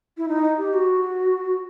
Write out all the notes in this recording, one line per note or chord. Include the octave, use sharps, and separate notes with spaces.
E4
D#4
G4
F#4